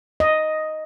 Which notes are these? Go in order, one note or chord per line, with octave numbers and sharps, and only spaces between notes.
D#5